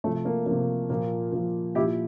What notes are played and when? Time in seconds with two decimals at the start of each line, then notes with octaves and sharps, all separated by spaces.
0.04 C3 F3 A3
0.25 A#3
0.46 C3 F3 A#3
0.90 A#2 F3 A#3
1.32 A#2 F3 A#3
1.75 A#2 E4 G4
1.80 F3